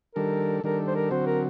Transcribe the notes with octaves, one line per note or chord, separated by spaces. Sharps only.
D#3 G3 D4 A4 A#4
D#3 G3 D4 A4 A#4
C5
A#4
D3 F#3 C4 F#4 C5
A#4